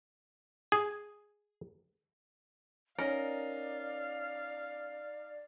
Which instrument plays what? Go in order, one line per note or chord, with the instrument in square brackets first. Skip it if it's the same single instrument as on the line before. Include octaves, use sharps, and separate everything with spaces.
[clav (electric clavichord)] G#4
[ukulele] C#4 A#4 [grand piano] D#4 [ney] D5 [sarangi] F5